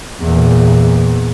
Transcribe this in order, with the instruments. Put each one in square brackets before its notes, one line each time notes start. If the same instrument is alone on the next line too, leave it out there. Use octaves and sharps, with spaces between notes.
[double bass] E2 A#2